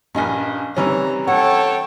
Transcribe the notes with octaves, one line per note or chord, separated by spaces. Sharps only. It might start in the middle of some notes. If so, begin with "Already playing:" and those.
A#1 G2 C#4 D#5 G#5
C3 E3 G3 C#4 D#4 A#5
A4 C#5 F#5 G5 A5